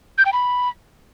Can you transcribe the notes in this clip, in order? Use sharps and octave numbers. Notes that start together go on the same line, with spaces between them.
G6
G5
B5